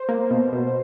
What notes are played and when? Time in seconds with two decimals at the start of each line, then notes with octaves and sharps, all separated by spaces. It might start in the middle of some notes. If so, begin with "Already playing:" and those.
Already playing: C5
0.09 A#3
0.30 B2
0.52 B2